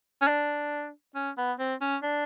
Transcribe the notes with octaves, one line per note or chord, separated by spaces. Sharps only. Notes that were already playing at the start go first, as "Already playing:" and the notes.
C#4
D4
C#4
B3
C4
C#4
D4